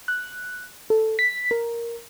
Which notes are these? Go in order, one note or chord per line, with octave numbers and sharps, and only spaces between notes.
F#6
A4
B6
A#4